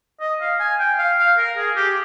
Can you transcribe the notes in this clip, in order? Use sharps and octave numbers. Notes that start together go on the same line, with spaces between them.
D#5
F5
G#5
G5
F5
F5
A#4
G#4
G4